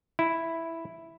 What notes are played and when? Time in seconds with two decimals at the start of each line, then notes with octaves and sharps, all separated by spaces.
0.19 E4